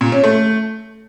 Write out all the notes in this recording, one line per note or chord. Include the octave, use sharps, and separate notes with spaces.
A#2
C#4
A3